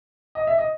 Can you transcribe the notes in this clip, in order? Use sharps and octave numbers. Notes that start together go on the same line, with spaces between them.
D#5
E5
D#5